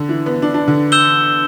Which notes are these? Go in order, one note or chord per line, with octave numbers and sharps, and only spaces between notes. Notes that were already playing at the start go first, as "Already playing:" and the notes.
Already playing: D3
E3
B3
D4
D4
D3
E6 G6 E7 G7